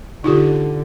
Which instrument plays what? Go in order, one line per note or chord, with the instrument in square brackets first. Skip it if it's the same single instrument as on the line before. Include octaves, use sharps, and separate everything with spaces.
[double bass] D3 [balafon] D#4 F4 G4